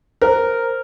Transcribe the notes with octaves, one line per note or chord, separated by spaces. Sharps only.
A#4 C5